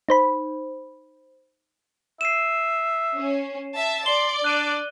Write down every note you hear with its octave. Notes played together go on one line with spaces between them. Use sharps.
D#4 C5 B5
E5 C7 D#7 E7
C#4
E5 A5
D5 C6 G7
D4 F#6 D#7